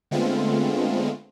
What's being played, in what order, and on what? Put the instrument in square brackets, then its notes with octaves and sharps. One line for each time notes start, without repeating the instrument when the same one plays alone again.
[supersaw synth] D3 G#3 A3 B3 C4 F4